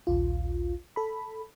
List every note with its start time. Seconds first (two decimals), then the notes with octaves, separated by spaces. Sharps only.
0.07 A#1 D#2 F4
0.96 A4 B5